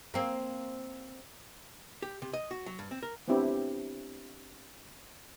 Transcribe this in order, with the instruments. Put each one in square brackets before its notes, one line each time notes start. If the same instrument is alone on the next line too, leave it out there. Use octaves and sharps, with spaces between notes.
[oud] A#3 C4
[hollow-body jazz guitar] G4
C3
D#5
F#4
F#3
G2
C4
A#4
[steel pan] B3 C4 D4 E4 G4